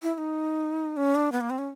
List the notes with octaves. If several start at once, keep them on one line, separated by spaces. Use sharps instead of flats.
E4
E4
D#4
C#4
D4
B3
A#3
C4
C#4